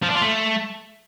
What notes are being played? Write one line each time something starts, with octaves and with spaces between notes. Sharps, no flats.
F3
D4
F4
A3